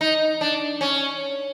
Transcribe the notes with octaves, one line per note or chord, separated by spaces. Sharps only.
D#4
D4
C#4